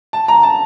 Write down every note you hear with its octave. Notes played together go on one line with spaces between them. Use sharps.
A5
A#5
A5